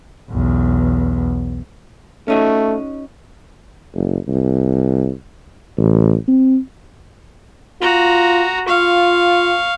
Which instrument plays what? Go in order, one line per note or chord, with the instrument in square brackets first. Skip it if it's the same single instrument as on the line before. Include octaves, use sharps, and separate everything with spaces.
[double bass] B1 E2
[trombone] A3 [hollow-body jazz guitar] C#4 D#4 F#4
[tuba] F#1
C2
A1
C4
[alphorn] F4 [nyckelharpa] F#4 A#5
[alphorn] F4 [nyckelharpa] F5 C#6